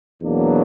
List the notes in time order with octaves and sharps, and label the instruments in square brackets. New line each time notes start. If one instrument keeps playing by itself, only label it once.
[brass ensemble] E2 B2 F#3 A#3 D4